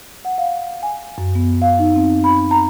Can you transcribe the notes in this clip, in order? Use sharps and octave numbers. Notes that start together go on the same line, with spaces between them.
F#5
F5
G#5
F#2
B3
F5
D#4
C4
B5
A#5